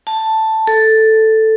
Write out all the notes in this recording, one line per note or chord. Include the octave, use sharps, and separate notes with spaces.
A5
A4